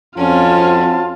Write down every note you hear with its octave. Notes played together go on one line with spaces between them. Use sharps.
F2 C4 C#4 F4 F#4 A5